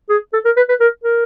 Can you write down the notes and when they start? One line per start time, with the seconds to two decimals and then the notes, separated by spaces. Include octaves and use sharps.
0.09 G#4
0.33 A4
0.45 A#4
0.56 B4
0.69 B4
0.80 A#4
1.03 A#4